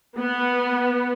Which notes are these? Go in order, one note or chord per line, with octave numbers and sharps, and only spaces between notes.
B3